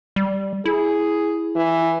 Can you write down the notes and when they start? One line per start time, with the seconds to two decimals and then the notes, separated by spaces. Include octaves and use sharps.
0.16 G3
0.65 E4 G#4
1.56 E3